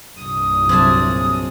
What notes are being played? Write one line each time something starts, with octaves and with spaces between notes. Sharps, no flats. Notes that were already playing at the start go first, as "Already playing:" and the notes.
C2 G2 A#2 D#6
C3 F#3 G#4 A5